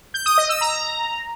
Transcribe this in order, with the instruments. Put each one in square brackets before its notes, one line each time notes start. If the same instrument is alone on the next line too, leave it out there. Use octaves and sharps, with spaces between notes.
[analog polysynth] G6
D#6
D#5
E6
A#5